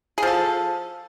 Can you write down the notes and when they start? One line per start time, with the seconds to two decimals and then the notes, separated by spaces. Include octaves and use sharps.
0.18 G#4
0.23 F3
0.27 A4